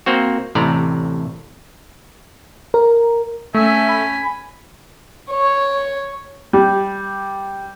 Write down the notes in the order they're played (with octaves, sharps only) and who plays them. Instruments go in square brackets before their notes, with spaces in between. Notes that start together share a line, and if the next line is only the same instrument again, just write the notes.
[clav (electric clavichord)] A#3 C4 F#4
A1 A2 C3 D5 A#5
[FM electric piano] A#4
[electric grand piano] A3 [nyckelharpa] C#4 G#5 [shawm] E5
[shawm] B5
[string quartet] C#5
[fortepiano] G3